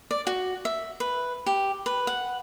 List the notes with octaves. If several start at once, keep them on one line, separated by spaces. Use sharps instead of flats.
D5
F#4
E5
B4
G4
B4
F#5